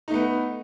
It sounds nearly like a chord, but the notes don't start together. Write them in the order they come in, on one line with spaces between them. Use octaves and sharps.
D#4 A3 B3